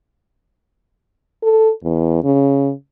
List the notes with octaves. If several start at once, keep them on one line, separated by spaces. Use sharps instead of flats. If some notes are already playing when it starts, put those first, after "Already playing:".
A4
E2
C#3